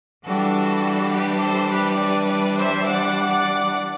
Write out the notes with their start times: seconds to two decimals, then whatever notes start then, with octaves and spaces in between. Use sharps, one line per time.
0.24 E3 G3 D4 F#4 A4
1.11 G4 B4
1.40 A4 C5
1.69 G4 B4
1.99 B4 D5
2.28 B4 D5
2.57 C5 E5
2.86 D5 F#5
3.29 D5 F#5